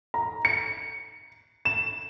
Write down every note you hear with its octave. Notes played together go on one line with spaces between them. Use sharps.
A#5
C#7
E7